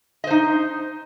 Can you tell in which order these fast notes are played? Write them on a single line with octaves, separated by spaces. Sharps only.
D#5 C5 D#4